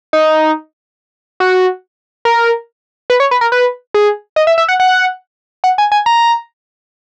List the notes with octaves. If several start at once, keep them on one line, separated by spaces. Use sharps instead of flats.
D#4
F#4
A#4
B4
C#5
B4
A#4
B4
G#4
D#5
E5
E5
F#5
F#5
F#5
G#5
G#5
A#5